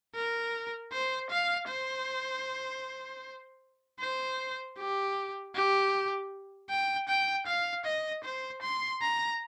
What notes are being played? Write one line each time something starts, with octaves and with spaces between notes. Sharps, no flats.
A#4
C5
F5
C5
C5
G4
G4
G5
G5
F5
D#5
C5
C6
A#5